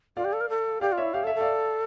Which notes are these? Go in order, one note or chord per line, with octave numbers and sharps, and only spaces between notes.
F4 D5 F5
G4
A4
A#4
A4
G4 D5 F5
F4
E4 C#5 E5
G4 F5
A4
E5
A4
D5 F5